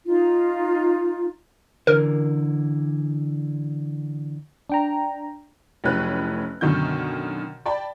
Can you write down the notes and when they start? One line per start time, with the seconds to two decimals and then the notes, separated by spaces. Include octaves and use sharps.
0.05 D#4 F4
1.87 D3 E3 A#4
4.70 D4 G5 A#5
5.84 F1 A2 F#3 C#4 B4 F#6
6.61 F#2 B2 D3 D#3 C#6 G6
7.66 D5 G5 A5 B5